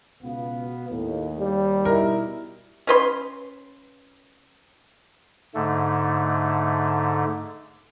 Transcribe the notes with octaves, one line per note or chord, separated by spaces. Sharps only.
C#2 B2 B3 F5
D#2 A2
G3
B2 D#4 E4 A#4
C#4 B4 C6
G#2 D3 A3